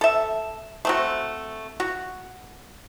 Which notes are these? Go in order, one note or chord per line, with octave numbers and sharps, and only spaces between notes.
A4 E5
A3 C4 F#4
F#4